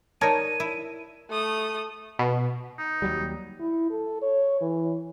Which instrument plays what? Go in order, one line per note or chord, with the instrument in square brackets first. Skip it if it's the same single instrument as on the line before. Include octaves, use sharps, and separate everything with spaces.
[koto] D#4 A#4 [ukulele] C#5 D5 [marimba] A5 [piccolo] D#7
[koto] E4
[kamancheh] A3 D#6
[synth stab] B2
[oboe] D#4
[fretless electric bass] D#2 F#3 G3
[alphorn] E4
A4
C#5
E3